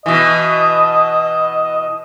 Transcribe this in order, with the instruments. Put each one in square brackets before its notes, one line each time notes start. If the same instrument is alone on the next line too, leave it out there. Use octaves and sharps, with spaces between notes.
[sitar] B2 E3 [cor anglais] D#5